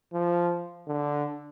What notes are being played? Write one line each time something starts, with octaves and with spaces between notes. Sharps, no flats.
F3
D3